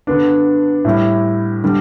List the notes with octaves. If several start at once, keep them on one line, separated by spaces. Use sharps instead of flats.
D3 B3 D4
A2 G3 E4
D3 G3